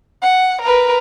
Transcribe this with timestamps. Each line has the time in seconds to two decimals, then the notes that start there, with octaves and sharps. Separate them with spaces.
0.22 F#5
0.61 A#4 B4